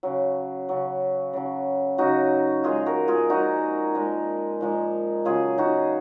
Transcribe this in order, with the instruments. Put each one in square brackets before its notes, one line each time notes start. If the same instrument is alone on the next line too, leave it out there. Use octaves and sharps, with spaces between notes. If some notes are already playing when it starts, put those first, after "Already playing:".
[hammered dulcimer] C#3 F#3
C#3 F#3
C#3 F#3
C#3 F#3 D#4 F#4
A#2 F3 G#3 F4 G#4
F#4 A#4
F4 G#4
A#2 F3 G#3 D#4 F#4
A#2 F3 G#3
A#2 F3 G#3
C#3 F#3 F4 G#4
D#4 F#4